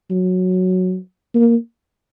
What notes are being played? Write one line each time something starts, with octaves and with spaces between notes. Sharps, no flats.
F#3
A#3